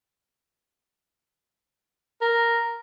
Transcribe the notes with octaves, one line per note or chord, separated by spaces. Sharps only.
A#4